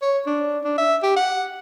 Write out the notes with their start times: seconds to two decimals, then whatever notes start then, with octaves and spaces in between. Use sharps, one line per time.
0.02 C#5
0.27 D4
0.64 D4
0.78 E5
1.03 G4
1.16 F#5